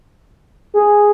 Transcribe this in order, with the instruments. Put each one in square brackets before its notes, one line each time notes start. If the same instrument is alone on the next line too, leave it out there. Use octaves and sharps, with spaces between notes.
[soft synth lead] G#4